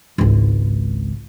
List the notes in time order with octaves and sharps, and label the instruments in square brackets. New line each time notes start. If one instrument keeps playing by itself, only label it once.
[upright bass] G#1 C#2